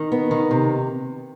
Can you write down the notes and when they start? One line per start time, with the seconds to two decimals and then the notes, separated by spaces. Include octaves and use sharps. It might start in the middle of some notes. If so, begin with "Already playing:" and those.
Already playing: D#3
0.12 B3
0.31 D#3
0.51 C3